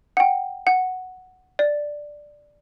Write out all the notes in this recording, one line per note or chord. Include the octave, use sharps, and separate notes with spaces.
F#5
G5
F#5
D5